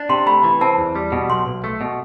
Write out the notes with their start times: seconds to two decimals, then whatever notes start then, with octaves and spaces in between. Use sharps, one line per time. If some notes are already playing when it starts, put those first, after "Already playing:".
Already playing: D4
0.09 C3 C6
0.26 A3 B5
0.44 E3
0.61 C4 A5
0.78 E2
0.95 G3
1.12 B2
1.30 B1 C6
1.47 B1
1.64 A3
1.81 B2